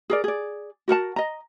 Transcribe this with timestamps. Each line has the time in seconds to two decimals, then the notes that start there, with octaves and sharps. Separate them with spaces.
0.10 G#4 A#4 D5
0.24 G#4 D5
0.88 F#4 A#4 F#5 A5
1.16 D#5 A#5